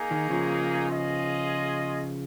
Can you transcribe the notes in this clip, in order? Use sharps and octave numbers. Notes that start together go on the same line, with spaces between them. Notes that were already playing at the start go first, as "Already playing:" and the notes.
Already playing: A#3 D#4 G#4
D#3
C#3 F3
F4 G#4 D#5